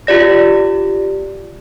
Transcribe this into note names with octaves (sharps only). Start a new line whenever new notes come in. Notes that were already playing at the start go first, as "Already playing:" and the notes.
F4 G4 D5 A#6